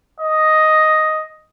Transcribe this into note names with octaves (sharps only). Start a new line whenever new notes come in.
D#5